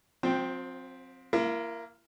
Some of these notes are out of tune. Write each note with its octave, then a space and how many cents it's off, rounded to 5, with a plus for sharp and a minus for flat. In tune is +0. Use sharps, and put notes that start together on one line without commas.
F3 +40 C4 +5 G5 +0
A#3 +0 E4 +40